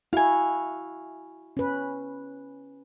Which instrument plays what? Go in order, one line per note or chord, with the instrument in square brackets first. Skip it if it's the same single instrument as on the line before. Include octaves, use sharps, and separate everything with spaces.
[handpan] E4 F#4 [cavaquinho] F5 G#5
[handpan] C#4 B4